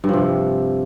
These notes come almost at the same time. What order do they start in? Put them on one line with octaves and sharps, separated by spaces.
G2 F3 C3